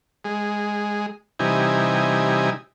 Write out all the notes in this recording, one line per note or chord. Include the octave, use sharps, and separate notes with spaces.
G#3
C3 E3 G3 D#4 G#5